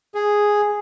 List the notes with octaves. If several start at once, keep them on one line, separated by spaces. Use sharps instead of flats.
G#4